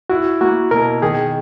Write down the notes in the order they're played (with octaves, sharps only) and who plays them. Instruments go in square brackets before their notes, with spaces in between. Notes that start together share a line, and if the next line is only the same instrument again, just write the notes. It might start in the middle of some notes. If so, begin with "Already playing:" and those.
[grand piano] E4 [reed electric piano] F#4
[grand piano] A#3 [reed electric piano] F#4
[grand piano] B2 [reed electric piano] A#4
[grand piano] D#3 [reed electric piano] G#4